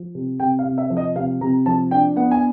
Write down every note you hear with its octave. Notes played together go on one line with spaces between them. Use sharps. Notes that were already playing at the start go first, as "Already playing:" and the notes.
Already playing: F3
C3
C3 G5
F5
C3
E5
F3
D#5
C3 F5
C3 A#5
F3 A5
D4 G5
B3 F#5
G#5